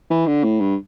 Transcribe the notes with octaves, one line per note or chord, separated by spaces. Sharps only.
E3
D3
A2
G2